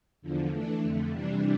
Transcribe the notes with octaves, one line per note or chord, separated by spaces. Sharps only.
E2 D3 F3
E3 A3 D4
F2 D3 A3
C3 E3 G3 D4